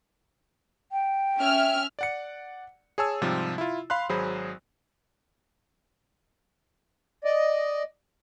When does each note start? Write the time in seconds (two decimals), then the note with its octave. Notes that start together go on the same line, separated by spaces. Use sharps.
0.92 G5
1.38 C#4 E5 F6
1.99 D5 F#5 C#7
2.98 G#4 C#5 G#5 A5 E6
3.21 G#2 C3 F3 G3
3.58 E4 F4
3.90 F5 B5 C6 F#6
4.09 G#1 F#3 G#4 C5 B5
7.24 D5 D#5